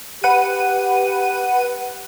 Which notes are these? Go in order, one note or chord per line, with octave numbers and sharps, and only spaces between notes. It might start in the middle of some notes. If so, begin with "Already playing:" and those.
G4 B4 F#5 D#7